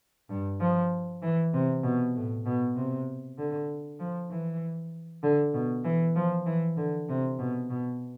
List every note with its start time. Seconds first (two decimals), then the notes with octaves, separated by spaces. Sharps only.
0.29 G2
0.60 F3
1.22 E3
1.54 C3
1.83 B2
2.15 A2
2.45 B2
2.76 C3
3.38 D3
3.99 F3
4.31 E3
5.23 D3
5.54 B2
5.85 E3
6.15 F3
6.46 E3
6.77 D3
7.09 C3
7.39 B2
7.70 B2